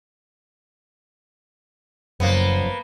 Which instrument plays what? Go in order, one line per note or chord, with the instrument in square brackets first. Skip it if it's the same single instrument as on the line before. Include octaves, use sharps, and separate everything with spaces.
[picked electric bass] F#1 [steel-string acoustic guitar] F#2 F3 [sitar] A#3 B3